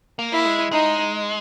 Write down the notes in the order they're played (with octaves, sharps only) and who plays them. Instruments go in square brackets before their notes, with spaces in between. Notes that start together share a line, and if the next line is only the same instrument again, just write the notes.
[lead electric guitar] A#3
[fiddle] E4
[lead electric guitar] G#3
[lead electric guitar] G#3 [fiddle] D#4